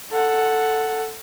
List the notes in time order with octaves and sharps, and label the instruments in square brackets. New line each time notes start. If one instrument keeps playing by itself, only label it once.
[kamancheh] A4 F#5